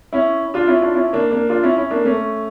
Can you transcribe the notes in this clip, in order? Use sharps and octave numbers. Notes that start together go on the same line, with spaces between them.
C#4 E4
D4 F4
C#4 E4
D4 F4
C#4 E4
A#3 D4
A#3 D4
D4 F4
C#4 E4
C#4 E4
A#3 D4
A3 C#4